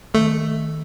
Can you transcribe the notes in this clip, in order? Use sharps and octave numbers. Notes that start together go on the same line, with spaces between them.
D#3 A3